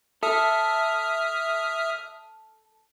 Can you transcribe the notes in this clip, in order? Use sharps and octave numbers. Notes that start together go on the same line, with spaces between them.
A4 E5 D#6 F6